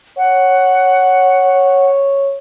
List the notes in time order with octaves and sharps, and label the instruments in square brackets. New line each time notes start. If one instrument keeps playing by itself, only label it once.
[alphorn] C#5 [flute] F#5